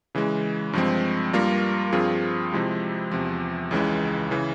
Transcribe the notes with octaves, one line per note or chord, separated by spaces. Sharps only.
C#3 E3 G#3
G2 F3 G#3 C4
G2 G3 A#3 F4 A#4
G2 F3 C4 F4 G#4
C3 F3 G#3 E4 G4
E2 C3 F3
C#2 C#3 E3 G#3
C#3 E3